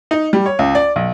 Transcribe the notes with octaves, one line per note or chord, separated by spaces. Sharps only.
D#4
G3
C#5
C#2
D5
B1